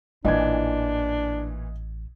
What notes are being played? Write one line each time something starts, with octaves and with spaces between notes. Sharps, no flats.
A1 A#2 E3 D4 E4 D#5 G#5 G#6